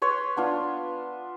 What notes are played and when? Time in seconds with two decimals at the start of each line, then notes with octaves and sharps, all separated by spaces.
0.02 B4 C#5 C6
0.37 B3 D4 F4